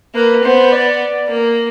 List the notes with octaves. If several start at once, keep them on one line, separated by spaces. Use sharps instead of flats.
A#3 B4
B3 C5
D5
A#3